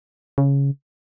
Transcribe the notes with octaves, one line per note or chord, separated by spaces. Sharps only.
C#3